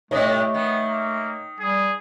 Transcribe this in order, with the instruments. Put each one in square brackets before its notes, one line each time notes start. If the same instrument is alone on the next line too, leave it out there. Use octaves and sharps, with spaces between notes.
[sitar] A2 C3 G3 [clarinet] A3 [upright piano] C#5 D#5
[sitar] D#3 [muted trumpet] B3
[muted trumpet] A#3
[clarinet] G3 [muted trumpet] G#4